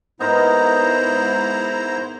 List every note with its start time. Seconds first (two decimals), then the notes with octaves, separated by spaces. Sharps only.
0.20 G#2 B3 D#4 E4 A#4 C5 A#5